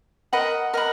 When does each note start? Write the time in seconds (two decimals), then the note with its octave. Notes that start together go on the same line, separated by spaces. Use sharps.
0.33 A#4 D#5 F#5 B5
0.74 A#4 D#5 F#5 B5